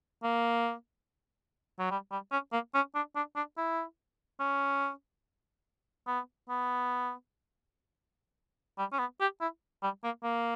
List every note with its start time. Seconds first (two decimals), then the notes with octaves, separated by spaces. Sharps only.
0.23 A#3
1.79 F#3
1.91 G3
2.11 G3
2.32 C#4
2.53 A#3
2.74 C#4
2.95 D4
3.15 D4
3.36 D4
3.57 E4
4.40 C#4
6.07 B3
6.50 B3
8.78 G3
8.93 C#4
8.99 B3
9.20 G4
9.41 E4
9.82 G3
10.04 A#3
10.24 A#3